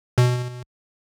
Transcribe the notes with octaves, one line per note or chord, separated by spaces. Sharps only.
B2